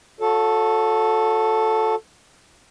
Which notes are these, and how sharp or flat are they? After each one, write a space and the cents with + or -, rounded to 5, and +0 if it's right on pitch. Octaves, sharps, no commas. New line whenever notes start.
F#4 -40 A4 +0 C#5 +0